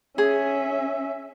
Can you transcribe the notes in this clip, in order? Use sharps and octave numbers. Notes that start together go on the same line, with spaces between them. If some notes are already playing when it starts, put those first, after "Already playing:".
C#4 G#4 E5